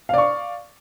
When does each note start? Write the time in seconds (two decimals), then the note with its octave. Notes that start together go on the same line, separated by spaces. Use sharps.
0.09 F5
0.14 D5
0.18 C#6